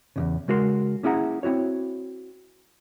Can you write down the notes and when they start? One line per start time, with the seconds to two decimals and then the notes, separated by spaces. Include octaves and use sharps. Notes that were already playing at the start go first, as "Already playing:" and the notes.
0.16 E2 A#2 C#3
0.48 C#3 G#3 F#4 A#4 D#5 C6
1.03 A#3 C#4 E4 G#4 F#5 A#5
1.43 C4 E4 F#4 C#5